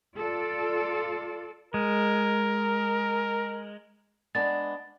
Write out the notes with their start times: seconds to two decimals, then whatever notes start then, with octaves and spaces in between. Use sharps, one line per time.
0.16 F4 A4 D5
1.74 G#3 A#4
4.35 G#3 B3 D4 A6